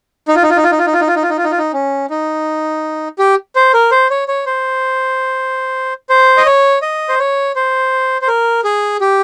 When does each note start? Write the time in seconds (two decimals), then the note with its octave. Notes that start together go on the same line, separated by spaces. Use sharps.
0.28 D#4
0.36 F4
0.43 D#4
0.50 F4
0.57 D#4
0.64 F4
0.72 D#4
0.79 F4
0.87 D#4
0.93 F4
1.01 D#4
1.08 F4
1.16 D#4
1.23 F4
1.30 D#4
1.37 F4
1.44 D#4
1.51 F4
1.58 D#4
1.73 C#4
2.10 D#4
3.19 G4
3.56 C5
3.74 A#4
3.91 C5
4.11 C#5
4.28 C#5
4.46 C5
6.10 C5
6.37 D#5
6.46 C#5
6.82 D#5
7.09 C5
7.19 C#5
7.56 C5
8.22 C5
8.28 A#4
8.64 G#4
9.01 G4